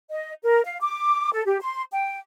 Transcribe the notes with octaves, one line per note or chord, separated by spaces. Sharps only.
D#5
A#4
F5
D6
A4
G4
C6
G5